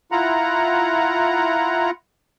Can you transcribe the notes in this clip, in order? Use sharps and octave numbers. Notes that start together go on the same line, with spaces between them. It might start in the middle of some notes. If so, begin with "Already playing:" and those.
E4 F4 F#5 A#5